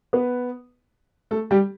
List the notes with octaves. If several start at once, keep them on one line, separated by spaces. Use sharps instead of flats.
B3 B4
A3 A4
G3 G4